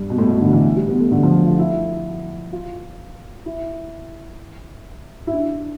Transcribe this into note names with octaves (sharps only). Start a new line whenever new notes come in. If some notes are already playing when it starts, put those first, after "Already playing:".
Already playing: G2
B2
A2
B2
D3
E3
G3
B3
A3
D3
F3
F4
E4
F4
E4
E4
D4